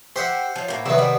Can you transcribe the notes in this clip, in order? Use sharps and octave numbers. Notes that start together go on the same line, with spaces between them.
G4 C5 E5 F#5
F3 C#5
A2 A#3
C3 D#3 F#3 B3 D5 E5
G3 D5